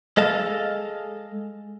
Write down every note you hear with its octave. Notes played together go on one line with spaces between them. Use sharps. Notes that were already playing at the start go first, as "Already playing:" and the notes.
G#3 A4 D#5 F5 A5